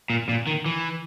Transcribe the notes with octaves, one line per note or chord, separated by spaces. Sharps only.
A#2
A#2
D#3
E3